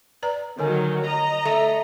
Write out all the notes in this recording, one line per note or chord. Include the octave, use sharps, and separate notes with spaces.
B4 D5 A#5
D3 D#3 F#3 A#4 C#5
D#5 A#5
A3 A4